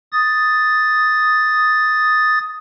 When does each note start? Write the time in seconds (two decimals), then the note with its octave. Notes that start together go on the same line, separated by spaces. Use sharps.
0.12 D#6 A6